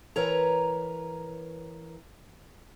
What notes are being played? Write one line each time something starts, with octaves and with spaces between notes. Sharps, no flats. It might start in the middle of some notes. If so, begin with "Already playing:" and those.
E3 A#4 B4 C#5 A#5